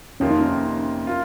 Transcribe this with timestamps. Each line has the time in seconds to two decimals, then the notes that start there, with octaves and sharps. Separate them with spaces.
0.20 F2 C3 D#3 A#3 C#4 F4
0.31 D#4
0.40 C#4
1.07 A#3 F4